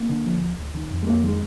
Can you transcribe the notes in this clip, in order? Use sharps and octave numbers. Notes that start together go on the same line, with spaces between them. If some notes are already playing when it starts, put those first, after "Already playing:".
Already playing: A#3
D3
F3
D2
D2
D#3
F2
G#3
F2 A#3
D#3 G#3